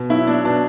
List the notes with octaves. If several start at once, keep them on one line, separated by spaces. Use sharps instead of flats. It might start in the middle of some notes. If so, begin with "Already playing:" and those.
Already playing: B2
F#3 E4
F#3 D4
B2 D4